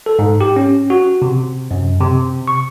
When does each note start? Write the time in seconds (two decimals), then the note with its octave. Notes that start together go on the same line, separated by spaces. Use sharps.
0.06 A4
0.19 G#2
0.41 G4
0.56 C#4
0.90 F#4
1.22 C3
1.71 F#2
2.01 C3
2.48 C#6